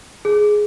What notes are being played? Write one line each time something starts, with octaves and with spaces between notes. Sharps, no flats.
G#4